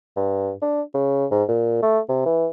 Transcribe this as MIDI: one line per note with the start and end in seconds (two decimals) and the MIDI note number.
0.17 0.52 43
0.62 0.82 62
0.94 1.26 49
1.31 1.44 44
1.49 1.78 46
1.83 2.00 57
2.09 2.24 48
2.26 2.48 52